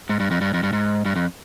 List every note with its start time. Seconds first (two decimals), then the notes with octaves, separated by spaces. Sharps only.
0.09 G#2
0.20 G2
0.31 F2
0.41 G2
0.54 F2
0.63 G2
0.73 G#2
1.05 G2
1.16 F2